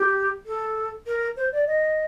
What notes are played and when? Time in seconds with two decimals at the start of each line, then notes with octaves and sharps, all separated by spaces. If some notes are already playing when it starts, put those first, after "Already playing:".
Already playing: G4
0.45 A4
1.06 A#4
1.36 C5
1.52 D5
1.66 D#5